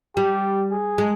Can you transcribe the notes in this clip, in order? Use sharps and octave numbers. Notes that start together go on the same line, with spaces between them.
G3 G4
G#4
G#3